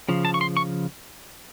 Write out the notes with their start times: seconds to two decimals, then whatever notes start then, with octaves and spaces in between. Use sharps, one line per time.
0.09 C#3 F3
0.25 A5
0.34 C#6
0.41 C6
0.57 C#6